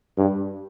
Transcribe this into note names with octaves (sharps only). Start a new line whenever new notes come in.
G2